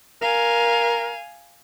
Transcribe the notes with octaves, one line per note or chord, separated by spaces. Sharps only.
A#4 F5 G#5